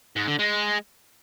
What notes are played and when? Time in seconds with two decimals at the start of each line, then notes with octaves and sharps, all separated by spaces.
0.16 G#2
0.28 D3
0.39 G#3